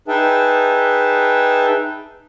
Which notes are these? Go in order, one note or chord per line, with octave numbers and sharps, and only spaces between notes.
D#4 G#4 B4 E5 G5 A5